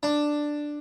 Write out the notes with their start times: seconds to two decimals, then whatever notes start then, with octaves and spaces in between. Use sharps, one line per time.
0.03 D4